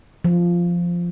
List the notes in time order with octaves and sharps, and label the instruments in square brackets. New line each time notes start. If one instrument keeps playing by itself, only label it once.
[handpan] F3